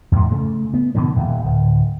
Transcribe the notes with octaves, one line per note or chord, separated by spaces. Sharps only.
E2 G#2
C#3 A3
B3
B2 D3 D#3 F3
D#1 D#2
D1